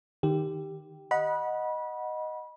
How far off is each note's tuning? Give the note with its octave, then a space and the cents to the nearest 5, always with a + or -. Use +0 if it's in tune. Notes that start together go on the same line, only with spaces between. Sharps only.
D#3 +0 G4 +0
D#5 +0 F#5 -5 B5 -25